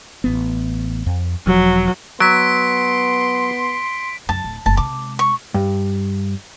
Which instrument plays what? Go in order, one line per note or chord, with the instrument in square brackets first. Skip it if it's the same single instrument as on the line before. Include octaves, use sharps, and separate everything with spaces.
[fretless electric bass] A1 B3
F2
[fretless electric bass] E1 F3 [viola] F#3
[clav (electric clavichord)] F#3 [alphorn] B3 [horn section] C6 [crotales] B6 D7
[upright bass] F#2 C#3 [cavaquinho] A5
[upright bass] D1
[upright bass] F#1 [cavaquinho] A5
[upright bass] C3 G#3 [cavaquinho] D6
[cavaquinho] C#6
[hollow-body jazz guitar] G2